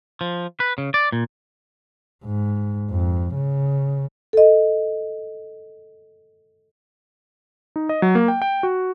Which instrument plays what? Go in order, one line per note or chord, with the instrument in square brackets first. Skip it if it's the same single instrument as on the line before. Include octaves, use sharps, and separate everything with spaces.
[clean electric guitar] F3
B4
C#3
D5
A#2
[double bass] G#2
F2
C#3
[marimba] A4 D#5
[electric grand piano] D#4
D#5
F#3
A#3
G5
G5
F#4